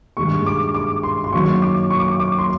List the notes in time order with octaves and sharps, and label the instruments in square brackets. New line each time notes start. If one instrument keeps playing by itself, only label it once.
[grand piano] G2 D#3 G#3 C#6
D6
D6
C6
C6
F#2 D#3 F#3 A#3 C#6
D6
C#6
D6
C#6
D6
C6